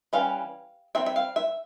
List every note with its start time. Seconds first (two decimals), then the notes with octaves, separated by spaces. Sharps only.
0.13 E3 G3 C#4 F5
0.95 G3 C4 E5
1.06 E5
1.16 F5
1.36 E5